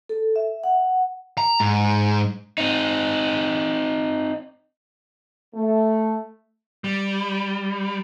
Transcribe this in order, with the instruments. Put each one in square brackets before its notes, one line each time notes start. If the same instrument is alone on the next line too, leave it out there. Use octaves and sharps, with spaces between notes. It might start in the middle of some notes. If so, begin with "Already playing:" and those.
[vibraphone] A4
E5
F#5
[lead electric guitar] A#5
G#2
[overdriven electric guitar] C4 D#4
[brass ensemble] A3
[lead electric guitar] G3